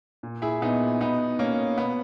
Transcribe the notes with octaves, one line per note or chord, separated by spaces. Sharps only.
A#2
E4 G#4
A#2 B3 D#4
B2 B3 D#4
B2 A#3 C#4
B2 B3